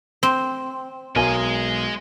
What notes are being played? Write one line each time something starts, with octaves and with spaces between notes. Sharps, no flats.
C4
B1 G#3 A#4 D#5 G#5